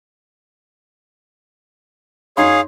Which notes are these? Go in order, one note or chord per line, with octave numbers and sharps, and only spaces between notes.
F#2 D#4 G#4 C#5 F5 C6